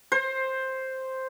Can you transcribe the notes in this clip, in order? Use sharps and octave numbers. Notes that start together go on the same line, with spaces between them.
C5